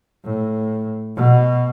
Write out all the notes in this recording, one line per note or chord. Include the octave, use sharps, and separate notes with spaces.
A2
B2